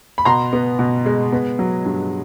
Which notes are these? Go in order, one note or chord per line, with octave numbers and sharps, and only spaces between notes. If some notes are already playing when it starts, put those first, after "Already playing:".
B5
B2 A#5 C6
B3
B2
G#3
B3
F#3
G2